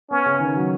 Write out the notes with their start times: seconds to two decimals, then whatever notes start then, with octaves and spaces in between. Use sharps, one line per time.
0.10 B3 C#4
0.26 C#3
0.40 D#3
0.56 F#3